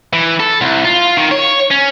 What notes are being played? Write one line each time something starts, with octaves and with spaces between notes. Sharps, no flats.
E3
A4
C2
F4
D#3
C#5
C#4